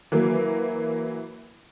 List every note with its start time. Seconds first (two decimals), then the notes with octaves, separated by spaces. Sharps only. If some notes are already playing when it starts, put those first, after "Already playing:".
0.12 E3 F#3 A#3